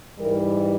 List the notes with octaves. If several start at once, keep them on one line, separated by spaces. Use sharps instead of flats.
G#2 E3 G3 A#4